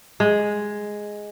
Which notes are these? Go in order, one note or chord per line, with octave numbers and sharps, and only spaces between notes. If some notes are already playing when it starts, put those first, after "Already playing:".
G#3